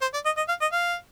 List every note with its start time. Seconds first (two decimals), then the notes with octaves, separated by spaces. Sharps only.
0.01 C5
0.14 D5
0.25 D#5
0.37 D#5
0.48 F5
0.61 D#5
0.73 F5